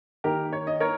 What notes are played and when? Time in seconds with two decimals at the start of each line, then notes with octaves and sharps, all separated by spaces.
0.24 D#3 A#3 G4 A#4
0.53 C#5
0.67 D#5
0.80 A#3 A#4 C#5